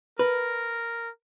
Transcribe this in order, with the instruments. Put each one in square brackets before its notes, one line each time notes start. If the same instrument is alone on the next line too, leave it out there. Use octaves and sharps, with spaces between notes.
[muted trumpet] A#4 [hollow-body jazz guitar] B4